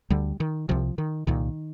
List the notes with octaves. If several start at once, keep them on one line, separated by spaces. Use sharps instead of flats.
D2 D3 G3
D#3
C2 C3 F3
D#3
C2 A#2 D#3